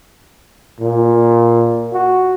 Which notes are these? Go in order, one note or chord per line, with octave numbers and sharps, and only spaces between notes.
A#2
F#4